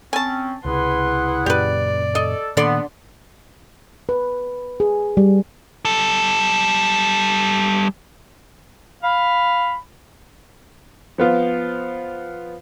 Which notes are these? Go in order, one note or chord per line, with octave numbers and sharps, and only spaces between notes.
C4 C#4 G#5 A5
C#2 C3 E4 G#4 B4 F#5 C6
F#2 A#2 C#3 G4 B4 D5
A4 D#5
A#2 D3 D#3 A#3 B3 D5 C6
B4
G#4
G3
G3 A4
F5 B5
F3 B3 F4